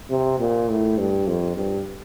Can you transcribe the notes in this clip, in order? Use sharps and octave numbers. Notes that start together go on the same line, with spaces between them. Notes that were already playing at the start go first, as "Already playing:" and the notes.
C3
A#2
A2
G2
F2
G2